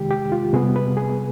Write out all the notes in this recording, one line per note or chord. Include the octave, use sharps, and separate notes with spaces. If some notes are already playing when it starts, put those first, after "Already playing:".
Already playing: C3 D#3 G#3 G4
G4
F4
C3 G3 B3 G#4
B4
G#4